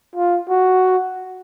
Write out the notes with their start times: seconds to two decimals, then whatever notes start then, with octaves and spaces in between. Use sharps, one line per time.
0.15 F4
0.49 F#4